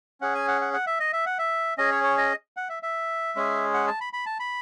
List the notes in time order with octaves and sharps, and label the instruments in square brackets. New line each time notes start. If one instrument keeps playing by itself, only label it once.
[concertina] C#4 G#4 F#5
G#5
F#5
F#5
F#5
E5
D#5
E5
F#5
E5
C#4 G#4 D#5
C#5
C#5
D#5
F#5
E5
E5
G#3 C#4 G#4
F#5
A5
B5
B5
A5
B5